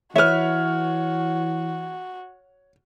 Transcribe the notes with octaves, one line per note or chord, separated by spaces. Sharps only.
E3 F#4 B4 C#5 E5 F6